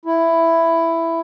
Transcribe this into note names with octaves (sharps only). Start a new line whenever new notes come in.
E4